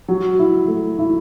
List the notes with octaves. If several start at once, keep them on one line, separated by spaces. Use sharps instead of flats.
F#3
E4
A3
E4